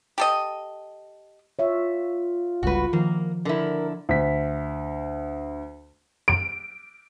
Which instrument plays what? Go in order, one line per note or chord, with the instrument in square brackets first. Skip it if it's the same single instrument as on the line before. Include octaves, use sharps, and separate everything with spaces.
[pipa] G4 A4 D#5
[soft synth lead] F4 [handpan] C#5 E5
[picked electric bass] G1 C#2 G3 [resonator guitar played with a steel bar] F#4 B4
[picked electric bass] D#3 [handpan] F3 [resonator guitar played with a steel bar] A#3
[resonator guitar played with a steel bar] D3 E4 [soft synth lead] A#4
[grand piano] D2 B6
[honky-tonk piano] D7